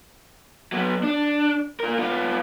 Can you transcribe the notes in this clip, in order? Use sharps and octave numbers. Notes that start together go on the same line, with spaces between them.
F#3 B3
D4
F4 A#4
B3 F4